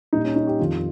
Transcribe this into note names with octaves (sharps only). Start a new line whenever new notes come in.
A#2 G3 D#4
C#4
D#4
G4
F2 D#3 G3 F4